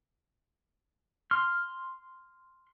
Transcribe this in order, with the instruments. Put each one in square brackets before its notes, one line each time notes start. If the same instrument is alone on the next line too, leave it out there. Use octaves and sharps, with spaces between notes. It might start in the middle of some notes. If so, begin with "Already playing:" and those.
[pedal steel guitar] C6 F6